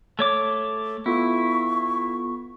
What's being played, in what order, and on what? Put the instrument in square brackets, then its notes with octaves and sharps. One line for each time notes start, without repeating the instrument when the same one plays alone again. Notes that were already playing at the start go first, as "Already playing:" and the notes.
[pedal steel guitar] A3 C#5 D6
[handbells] B3 F4 A4 [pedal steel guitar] E4 [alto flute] C#6